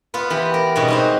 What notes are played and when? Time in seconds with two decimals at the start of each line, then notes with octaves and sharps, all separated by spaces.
0.14 B3 F4 B4
0.30 E3 B3 G4 B4
0.54 A#4
0.75 G#2 B2 G3 B3 C#4 F#4
0.88 C4 D#4 C5